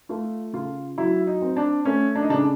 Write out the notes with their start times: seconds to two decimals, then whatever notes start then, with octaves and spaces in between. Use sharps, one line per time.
0.09 A3 F4
0.53 C#3 F4
0.98 F#3 E4
1.27 D#4
1.42 C4
1.57 D4
1.85 A3 C#4
2.15 D4
2.22 D#4
2.30 C#3 D4